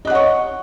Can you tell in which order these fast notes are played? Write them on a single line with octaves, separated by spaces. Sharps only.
D#5 F#6 F#5 C#5 C#6